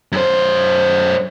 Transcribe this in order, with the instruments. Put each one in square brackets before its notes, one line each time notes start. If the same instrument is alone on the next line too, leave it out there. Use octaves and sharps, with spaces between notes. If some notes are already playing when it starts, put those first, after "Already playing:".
[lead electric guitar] F#2 C5